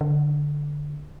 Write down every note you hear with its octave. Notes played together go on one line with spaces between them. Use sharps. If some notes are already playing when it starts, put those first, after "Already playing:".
D3